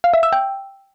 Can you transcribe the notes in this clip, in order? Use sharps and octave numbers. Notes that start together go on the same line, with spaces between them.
F5
E5
E6
G5